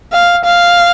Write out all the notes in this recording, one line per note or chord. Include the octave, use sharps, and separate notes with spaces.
F5
F5